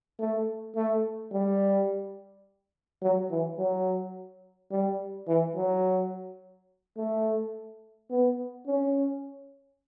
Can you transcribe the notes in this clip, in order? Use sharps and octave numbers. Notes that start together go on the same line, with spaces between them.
A3
A3
G3
F#3
E3
F#3
G3
E3
F#3
A3
B3
C#4